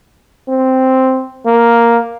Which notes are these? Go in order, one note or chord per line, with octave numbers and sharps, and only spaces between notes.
C4
A#3